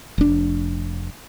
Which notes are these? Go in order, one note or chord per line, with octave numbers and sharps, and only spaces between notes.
F1 D4